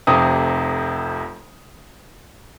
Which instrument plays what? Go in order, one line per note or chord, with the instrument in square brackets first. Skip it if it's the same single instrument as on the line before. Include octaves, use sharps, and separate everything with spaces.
[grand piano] F1 F2 C3 D#6